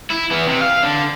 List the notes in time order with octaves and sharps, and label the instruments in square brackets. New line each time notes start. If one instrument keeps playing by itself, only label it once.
[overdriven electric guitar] E4
E3 B3
C3
F5
D3